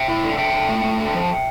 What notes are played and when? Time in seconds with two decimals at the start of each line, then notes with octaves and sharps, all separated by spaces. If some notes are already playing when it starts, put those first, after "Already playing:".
Already playing: E5 G5
0.08 E4
0.23 D3
0.38 D3 E5 G5
0.54 D3
0.69 A3
0.84 A3
0.99 D3
1.15 F3